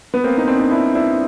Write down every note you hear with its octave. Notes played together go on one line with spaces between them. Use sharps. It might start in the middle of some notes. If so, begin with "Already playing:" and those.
B3
A#3 C4
D#4
C4 D4
D#4
D4 E4
D4 E4